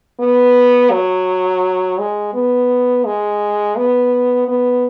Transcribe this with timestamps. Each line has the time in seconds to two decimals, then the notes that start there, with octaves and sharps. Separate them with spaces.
0.19 B3
0.91 F#3
1.99 G#3
2.33 B3
3.05 G#3
3.77 B3
4.48 B3